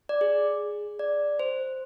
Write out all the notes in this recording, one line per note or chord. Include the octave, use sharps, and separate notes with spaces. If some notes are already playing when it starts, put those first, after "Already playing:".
D5
G#4
D5
C5